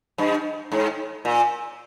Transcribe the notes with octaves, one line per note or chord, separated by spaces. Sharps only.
G2
G#2
A#2